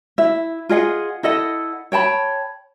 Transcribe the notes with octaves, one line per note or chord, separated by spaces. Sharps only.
E4 E5
F4 G#4 D#5 F#5
E4 A4 D#5 F#5
C#5 G5 A5 B5